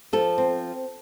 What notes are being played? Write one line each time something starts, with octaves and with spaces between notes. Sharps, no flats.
F3 A4
C4